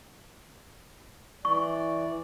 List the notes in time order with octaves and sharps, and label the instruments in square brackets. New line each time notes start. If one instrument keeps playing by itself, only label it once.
[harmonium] E3 D5 [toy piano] C#6